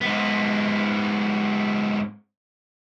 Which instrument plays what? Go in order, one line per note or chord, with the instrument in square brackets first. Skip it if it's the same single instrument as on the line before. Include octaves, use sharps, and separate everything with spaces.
[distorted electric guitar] G#2 B3